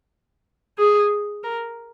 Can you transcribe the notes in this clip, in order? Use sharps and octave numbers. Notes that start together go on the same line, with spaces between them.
G#4
A#4